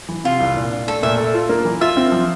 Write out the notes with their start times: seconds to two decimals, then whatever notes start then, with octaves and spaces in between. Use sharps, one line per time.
0.09 E3
0.24 C3 F4
0.40 C2
0.57 A#2
0.71 D4
0.87 A3 A4
1.03 A#2 E5
1.18 A4
1.34 F4
1.49 A#3
1.65 E3
1.81 F4 E5
1.97 C4
2.12 F3